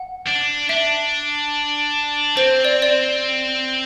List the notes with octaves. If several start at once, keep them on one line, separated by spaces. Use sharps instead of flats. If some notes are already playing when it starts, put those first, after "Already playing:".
Already playing: F#5
D4
D4 E5
C4 C5
D5
D5